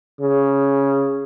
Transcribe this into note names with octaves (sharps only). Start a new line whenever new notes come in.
C#3